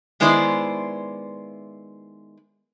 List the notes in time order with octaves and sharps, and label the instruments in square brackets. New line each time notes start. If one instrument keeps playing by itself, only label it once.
[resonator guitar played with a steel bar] D#3 G#3 B3 E4 C5 D5